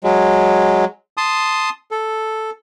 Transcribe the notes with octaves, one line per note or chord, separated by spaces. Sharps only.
F#3 G#3
A5 C6 D#6
A4